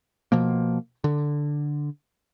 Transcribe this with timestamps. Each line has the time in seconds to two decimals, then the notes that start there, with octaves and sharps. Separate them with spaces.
0.32 B2 F3 A#3
1.04 D3